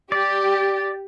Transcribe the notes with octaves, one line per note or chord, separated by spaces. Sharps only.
G4 D5